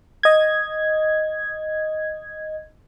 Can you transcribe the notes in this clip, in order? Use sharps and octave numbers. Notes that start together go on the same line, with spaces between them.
D#5 G#6